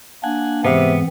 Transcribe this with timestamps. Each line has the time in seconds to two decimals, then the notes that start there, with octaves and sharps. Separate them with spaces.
0.24 A#3 D4 F#5 G#5
0.65 G#2 C3 E3 B3 C4